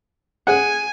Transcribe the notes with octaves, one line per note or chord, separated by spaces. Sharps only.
G#4 F#5 G#5